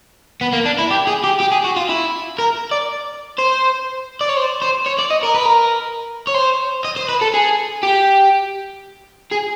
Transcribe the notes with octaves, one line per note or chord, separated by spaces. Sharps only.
B3
A#3
D4
E4
G4
G#4
G4
G4
G#4
F#4
F4
E4
A#4
D5
C5
D5
C#5
C5
C5
C#5
D5
D#5
A#4
B4
A#4
C#5
C5
D#5
C5
B4
A4
G#4
G4
G#4